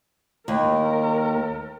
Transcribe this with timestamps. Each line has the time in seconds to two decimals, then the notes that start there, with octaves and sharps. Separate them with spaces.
0.48 D#2 A#4